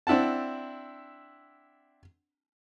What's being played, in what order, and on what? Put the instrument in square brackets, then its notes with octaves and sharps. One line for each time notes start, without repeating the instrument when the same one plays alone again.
[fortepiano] C4 D4 E4 F#5 A5